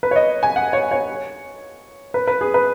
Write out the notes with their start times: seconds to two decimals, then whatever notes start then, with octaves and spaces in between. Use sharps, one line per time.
0.03 B4
0.11 C#5
0.16 D#5
0.43 G#5
0.56 F#5
0.73 C#5
0.91 C#5
2.14 B4
2.27 B4
2.41 G#4
2.54 B4